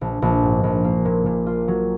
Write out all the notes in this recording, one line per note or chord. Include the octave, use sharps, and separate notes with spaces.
A#1
A#1
G#2
A#1
A#3
A#2
A#2
F4
F#3